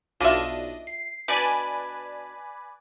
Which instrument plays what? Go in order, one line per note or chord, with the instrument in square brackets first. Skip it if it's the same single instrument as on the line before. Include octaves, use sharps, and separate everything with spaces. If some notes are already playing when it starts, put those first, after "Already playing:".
[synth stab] B1 D4 D#5 [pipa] F4 E5
[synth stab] C7
[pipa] B2 D4 [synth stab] B4 D5 G#5